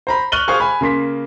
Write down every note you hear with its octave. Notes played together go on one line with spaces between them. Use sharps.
C5 A#5 B5
C#6 F6 F#6 D#7 F#7 G7
G#4 C5 F5 G#5 C#6 F6
G#5 B5
C#3 A#3 C6 B6